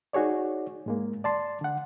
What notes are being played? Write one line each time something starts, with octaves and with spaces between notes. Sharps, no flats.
D#4 F#4 G#4 C#5 D5
G#2 G#3 A#3
D5 A5 C6
D3 F#5